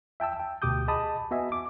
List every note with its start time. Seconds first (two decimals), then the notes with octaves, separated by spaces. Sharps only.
0.20 E5 G5 A5 E6
0.40 G5
0.62 D2 B2 G4 D6 D#6 G6
0.88 G#4 D#5 A5 B5 D#6
1.31 B3 F#4 D#5 E5 G#5
1.52 D6